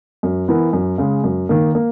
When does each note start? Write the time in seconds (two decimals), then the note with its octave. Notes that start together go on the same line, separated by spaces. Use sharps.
0.23 F#2
0.48 E3 B3 E4 A#4
0.73 F#2
0.98 C#3 G#3
1.24 F#2
1.49 D#3 A#3
1.75 A#3